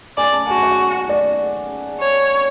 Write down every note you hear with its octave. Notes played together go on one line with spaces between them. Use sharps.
D5 G#5
A5
F#4 G#5
F#5
D5
C#5